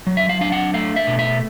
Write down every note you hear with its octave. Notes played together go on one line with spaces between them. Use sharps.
F#3
E5
F5
D4 F5
F#5
A3 F5
E5
B2
E5